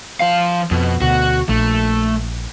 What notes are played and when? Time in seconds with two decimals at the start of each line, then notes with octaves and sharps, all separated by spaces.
0.20 F3 F5
0.71 F2 B2
1.02 D2 B2 F#4
1.49 A#1 A3